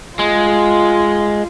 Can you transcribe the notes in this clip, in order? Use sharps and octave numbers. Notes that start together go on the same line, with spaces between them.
G#3 F4